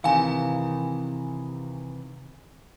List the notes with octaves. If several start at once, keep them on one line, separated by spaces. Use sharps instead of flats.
C3 D#3 E3 F5 G#5